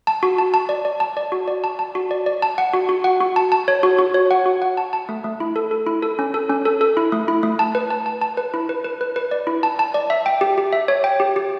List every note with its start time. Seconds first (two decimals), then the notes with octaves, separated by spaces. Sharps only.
0.07 A5
0.23 F#4
0.38 A5
0.54 A5
0.69 D5
0.85 D5
1.00 A5
1.17 D5
1.32 F#4
1.48 D5
1.64 A5
1.79 A5
1.95 F#4
2.11 D5
2.26 D5
2.42 A5
2.58 F#5
2.73 F#4
2.89 F#4
3.04 F#5
3.21 F#4
3.36 A5
3.52 A5
3.68 C#5
3.83 F#4
3.99 F#4
4.14 C#5
4.31 F#5
4.46 F#4
4.62 F#5
4.77 A5
4.93 A5
5.09 A3
5.24 A3
5.40 E4
5.56 A4
5.71 A4
5.86 E4
6.02 A4
6.19 C#4
6.34 A4
6.50 C#4
6.65 A4
6.81 A4
6.97 E4
7.12 A3
7.28 E4
7.43 A3
7.59 A5
7.75 B4
7.90 A5
8.06 A5
8.21 A5
8.37 B4
8.54 E4
8.69 B4
8.85 B4
9.01 B4
9.16 B4
9.31 D5
9.47 E4
9.63 A5
9.79 A5
9.94 D5
10.10 E5
10.26 G5
10.41 G4
10.58 G4
10.73 E5
10.88 C#5
11.04 G5
11.20 G4
11.36 G4